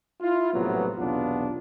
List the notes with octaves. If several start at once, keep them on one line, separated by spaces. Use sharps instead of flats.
E4 F4
A#1 A2 C3 F#3 B3
B1 E2 C3 B3 D4 F4